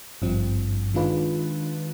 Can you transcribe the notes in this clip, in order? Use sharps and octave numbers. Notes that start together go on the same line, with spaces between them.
G#1 G2 F3 C4
D#3 G#3 D4 F4 B4